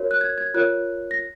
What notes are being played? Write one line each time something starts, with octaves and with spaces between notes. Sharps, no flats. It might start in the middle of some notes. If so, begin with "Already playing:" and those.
Already playing: F#4 A#4 C#5
F#6
G#6
G#6
F4 A#4 C#5 F#6
A#6